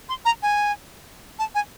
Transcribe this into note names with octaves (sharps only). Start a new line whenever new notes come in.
C6
A#5
G#5
A5
G#5